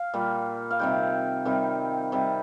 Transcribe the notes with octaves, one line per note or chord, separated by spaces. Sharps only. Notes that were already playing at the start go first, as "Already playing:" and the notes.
Already playing: F5
A#2 G3
F5
C3 D#3 G3 G5
C3 D#3 G3
C3 G3